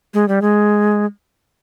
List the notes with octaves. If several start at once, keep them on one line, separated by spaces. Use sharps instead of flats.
G#3
G3
G#3